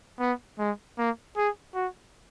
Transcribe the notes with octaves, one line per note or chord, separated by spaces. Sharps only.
B3
G#3
A#3
G#4
F#4